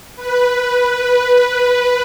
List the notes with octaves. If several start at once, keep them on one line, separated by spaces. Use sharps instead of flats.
B4